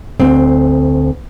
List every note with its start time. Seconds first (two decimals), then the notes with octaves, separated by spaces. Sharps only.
0.20 D2 C4